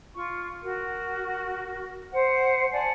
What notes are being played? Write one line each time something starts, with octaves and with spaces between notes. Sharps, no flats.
F4 C#6
F#4 A#4
C5 F#5
D5 F#5 G#5 A5